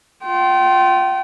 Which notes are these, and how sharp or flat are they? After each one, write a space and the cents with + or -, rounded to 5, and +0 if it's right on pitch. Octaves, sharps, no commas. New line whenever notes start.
F4 +5 G5 -35